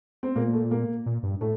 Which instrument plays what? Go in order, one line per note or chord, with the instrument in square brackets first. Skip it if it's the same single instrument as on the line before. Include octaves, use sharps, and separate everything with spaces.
[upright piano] C4
[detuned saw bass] A#2 [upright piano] A#3
[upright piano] A3
A#3
[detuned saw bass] A#2
G2
[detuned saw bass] A2 [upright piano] A3